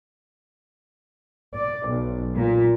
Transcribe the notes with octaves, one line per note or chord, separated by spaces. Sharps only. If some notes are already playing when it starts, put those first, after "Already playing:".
D5
B1
A#2